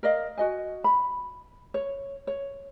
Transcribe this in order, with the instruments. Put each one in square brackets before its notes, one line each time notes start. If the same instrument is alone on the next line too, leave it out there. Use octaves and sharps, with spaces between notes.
[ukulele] A#4 D5 D#5 F5
F#4 D#5 G#5
B5
C#5
C#5